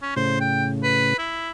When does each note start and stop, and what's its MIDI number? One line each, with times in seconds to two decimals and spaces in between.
0.02 0.13 61
0.17 1.14 45
0.17 1.14 49
0.17 0.39 72
0.40 0.66 79
0.83 1.17 71
1.19 1.51 64